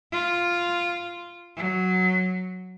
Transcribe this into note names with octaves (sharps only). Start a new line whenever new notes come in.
F4
F#3